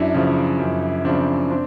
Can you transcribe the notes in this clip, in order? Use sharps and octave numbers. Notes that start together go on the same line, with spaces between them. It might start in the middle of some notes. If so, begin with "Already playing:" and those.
Already playing: F#2 D4 E4
C#3 F3
F#2
C#3 F3 C4 D4
C4 D4